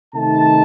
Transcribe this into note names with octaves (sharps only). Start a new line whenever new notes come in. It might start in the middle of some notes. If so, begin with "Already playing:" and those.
C3 D#3 A3 D#4 A5